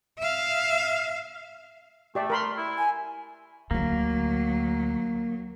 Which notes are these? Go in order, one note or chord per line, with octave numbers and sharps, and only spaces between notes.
E5 F5
A3 G4 D5 E5
A#4 B5 C6
E4
G#5
D2 D3 F#3 A#3